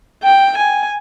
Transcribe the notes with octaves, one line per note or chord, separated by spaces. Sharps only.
G5
G#5